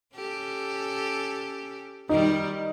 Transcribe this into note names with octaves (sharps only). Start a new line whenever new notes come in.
C#4 G4 A4
D#3 G3 D#4